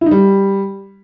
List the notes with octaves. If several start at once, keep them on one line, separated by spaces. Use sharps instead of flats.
E4
D#4
G3